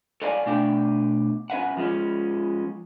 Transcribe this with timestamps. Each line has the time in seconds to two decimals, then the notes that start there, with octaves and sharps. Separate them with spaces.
0.22 A4 C#5 D5 F5 G5 G#5
0.46 B2 A3 D4 E5 G5
1.50 C#4 B4 E5 F#5
1.77 F3 G#3 A3 C#4